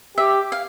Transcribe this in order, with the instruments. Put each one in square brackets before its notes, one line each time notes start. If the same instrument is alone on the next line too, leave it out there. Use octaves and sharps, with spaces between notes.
[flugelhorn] G4 [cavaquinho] E5
[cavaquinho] F5